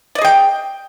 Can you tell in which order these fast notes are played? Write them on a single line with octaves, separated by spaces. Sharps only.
D5 D#5 G#4 G5